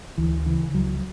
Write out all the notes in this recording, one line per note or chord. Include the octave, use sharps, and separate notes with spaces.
D2 E3
C#3 E3
C#2 F#3